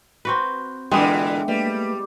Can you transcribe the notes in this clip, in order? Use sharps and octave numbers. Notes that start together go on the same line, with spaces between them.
C4 F#4 B4
A#2 D3 E3 G#3 B3 D4 G5
G3 A3 A#3 B4